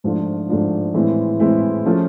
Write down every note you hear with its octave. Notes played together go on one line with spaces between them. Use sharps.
G#2 F3 A3 D4 F4
G#2 F3 A3 D4 F4
A2 E3 G#3 C4 E4
A2 E3 G#3 C4 E4
F3 A3 C#4 F4